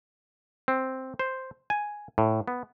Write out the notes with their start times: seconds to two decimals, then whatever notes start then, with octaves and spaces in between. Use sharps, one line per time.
0.68 C4
1.19 C5
1.70 G#5
2.18 A2
2.48 B3